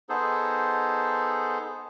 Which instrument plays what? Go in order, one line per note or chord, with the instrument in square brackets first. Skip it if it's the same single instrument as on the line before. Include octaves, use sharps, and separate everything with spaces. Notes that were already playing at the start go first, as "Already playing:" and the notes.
[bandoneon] B3 D#4 G#4 A4 C5